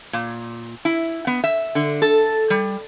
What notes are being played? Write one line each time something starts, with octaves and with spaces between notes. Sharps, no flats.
A#2
E4
B3
E5
D3
A4
G3